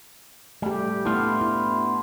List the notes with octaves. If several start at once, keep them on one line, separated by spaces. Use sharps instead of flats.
G3 A3 G4
A3 B3 D4 E4 F4
E4